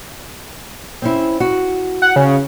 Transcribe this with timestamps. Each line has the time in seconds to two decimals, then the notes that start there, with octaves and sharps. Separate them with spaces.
1.02 C4 C#4 E4
1.40 F#4
2.02 F#5
2.16 C#3